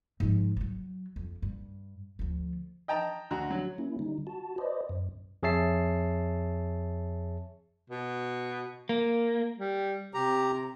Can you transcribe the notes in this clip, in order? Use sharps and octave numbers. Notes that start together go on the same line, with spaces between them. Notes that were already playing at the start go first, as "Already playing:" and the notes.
G#2 F3
F3 F#3
F2
G2
D2 F3
D#5 G5 A5 A#5
D2 F#4 A#5
F#3
A#3 C#4 E4
D3 G3 D#4
F#4 A5
B4 C5 D5 D#5
F#2
F2 G#4 C#5 E5 A5 C7
B2
A#3
G3
C3 G4 A#5